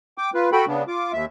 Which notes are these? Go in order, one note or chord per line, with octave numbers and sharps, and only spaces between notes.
G5 D6
F4 B4
F#4 A4 G5 B5
C#3 B3 D4
F4 D6
D#2 E5